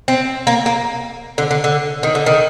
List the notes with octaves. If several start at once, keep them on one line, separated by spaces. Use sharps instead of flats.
C4
A#3
A#3
D3
D3
D3
D#3
D3
D#3